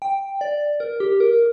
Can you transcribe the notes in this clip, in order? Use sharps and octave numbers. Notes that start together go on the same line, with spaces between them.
G5
D5
A#4
G4
A#4